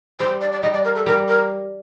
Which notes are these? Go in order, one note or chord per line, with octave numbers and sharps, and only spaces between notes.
G3 C5
D5
D5
G3 D#5
D5
A#4
A4
G3 A#4
A#4